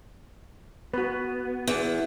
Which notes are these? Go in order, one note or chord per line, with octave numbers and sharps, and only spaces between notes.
B3 F#4 B4
E2